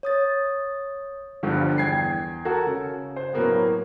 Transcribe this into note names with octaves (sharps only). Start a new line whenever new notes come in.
C#5 D#6 A6
G1 G2 D3 F3 G3
E2 G5 G#6 C7
F#4 A4 A#4
C#3
C5
A2 F#3 A#3 B3